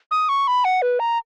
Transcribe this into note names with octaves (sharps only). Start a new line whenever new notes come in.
D#6
C#6
B5
F#5
B4
A#5